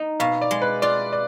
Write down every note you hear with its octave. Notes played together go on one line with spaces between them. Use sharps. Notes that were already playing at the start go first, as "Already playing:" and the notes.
Already playing: D#4
B2 F5
D5
G#3
B4
F4 D5
D5